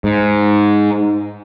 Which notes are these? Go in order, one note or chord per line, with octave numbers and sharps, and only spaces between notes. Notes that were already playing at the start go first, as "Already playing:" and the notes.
G#2